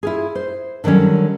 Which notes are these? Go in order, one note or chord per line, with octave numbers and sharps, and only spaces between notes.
E4 F4 G#4
C5
D3 D#3 F#3 G3 C#4